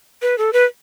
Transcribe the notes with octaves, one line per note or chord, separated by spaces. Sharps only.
B4
A4
B4